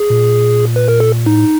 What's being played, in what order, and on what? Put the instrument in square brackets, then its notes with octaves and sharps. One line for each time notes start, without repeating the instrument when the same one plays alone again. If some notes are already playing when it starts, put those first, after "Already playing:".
Already playing: [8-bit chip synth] G#4
[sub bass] A#2
[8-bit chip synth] B4
A#4
A4
[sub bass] A2 [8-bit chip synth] D#4